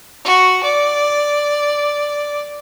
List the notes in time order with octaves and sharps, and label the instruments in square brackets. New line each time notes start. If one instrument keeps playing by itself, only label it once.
[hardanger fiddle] F#4
D5